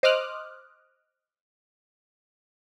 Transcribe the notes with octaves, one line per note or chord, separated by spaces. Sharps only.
C5 D#5 D6 D#6 F6 F#6